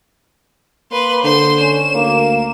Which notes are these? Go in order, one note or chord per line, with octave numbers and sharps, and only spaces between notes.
A#3 B4 C6
D3 C5 C6
C#4 E7
D2 A#3